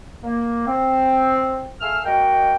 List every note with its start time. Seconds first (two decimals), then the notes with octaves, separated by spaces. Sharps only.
0.23 A#3
0.67 C4
1.81 A3 G#4 F5 E6 F6
2.05 G#3 A#3 F#4 A#4 D#5 G5